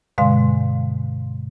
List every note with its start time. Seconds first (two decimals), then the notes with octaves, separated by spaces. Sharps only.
0.18 G2 B2 D3 G#3 F5 C6